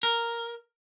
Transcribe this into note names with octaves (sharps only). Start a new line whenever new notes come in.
A#4